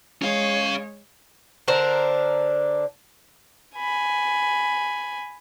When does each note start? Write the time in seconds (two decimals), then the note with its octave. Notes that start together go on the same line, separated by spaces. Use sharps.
0.22 G#3 C#4 C#5 F5
1.68 D3 D4 A#4 C5
3.76 G#5 B5